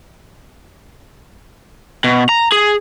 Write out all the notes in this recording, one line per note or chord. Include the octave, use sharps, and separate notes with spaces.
B2
A#5
G#4